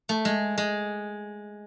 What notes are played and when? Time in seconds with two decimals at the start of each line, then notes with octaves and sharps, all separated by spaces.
0.09 A3
0.25 G#3
0.58 G#3